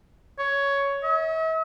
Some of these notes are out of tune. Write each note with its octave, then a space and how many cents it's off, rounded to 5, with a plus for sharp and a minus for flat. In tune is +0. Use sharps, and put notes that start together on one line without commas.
C#5 +10
E5 -45